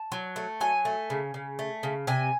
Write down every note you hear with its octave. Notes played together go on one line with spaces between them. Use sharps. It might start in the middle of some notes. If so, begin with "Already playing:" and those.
Already playing: A5
F#3
A3
F#3 G#5
A3
C#3
C#3
A3
C#3
C3 G#5